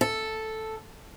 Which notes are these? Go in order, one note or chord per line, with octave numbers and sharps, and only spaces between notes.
A4